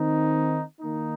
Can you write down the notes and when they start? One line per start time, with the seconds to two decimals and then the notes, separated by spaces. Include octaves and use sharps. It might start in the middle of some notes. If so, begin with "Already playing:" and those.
Already playing: D#3 C4 D#4
0.80 D#3 A#3 D#4